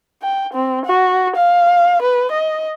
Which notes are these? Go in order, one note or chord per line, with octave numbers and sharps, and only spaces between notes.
G5
C4
F#4
F5
B4
D#5